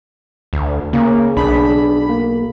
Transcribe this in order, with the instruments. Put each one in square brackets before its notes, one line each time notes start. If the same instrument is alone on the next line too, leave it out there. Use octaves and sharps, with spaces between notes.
[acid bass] D2
[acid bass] C#3 [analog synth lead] A#3
[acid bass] B1 [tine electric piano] D4 G#4 D5 [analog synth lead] B5
[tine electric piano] A#3